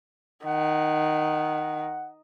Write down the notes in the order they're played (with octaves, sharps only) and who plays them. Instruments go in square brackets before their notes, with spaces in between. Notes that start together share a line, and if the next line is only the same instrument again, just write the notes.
[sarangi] D#3 [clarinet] F#5